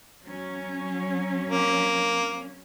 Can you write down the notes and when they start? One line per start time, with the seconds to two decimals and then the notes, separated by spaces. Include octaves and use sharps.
0.25 F#3 C#4
1.49 A#3